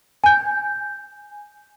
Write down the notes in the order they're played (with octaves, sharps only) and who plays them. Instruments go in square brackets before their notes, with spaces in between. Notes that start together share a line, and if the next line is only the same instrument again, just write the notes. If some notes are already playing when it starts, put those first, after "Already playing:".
[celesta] G#5 G6